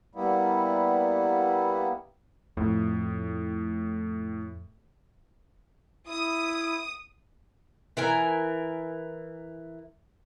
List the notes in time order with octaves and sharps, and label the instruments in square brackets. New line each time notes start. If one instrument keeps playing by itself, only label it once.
[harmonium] G3 A#3 B3 E4
[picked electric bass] F2 [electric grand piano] A2
[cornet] E4 [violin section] D#6
[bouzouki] E3 A#4 G#5